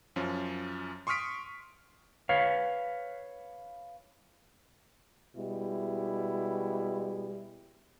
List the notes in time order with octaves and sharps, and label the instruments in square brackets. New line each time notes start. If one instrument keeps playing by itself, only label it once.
[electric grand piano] F#2 F3 C#4
C6 C#6 D#6 F6 B6 D7
[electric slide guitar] B4 C#5 F5
[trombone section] B2 G3 G#3 E4